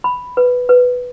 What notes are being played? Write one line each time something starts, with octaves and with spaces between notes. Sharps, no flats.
B5
B4
B4